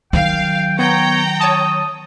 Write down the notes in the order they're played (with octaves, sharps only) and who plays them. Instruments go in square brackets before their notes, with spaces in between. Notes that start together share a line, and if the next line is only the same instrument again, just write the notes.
[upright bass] D#3 F#3 [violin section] F5 [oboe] G5
[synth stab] B3 [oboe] C#5 [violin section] G5 A#5
[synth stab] C#5 A5 [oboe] D#6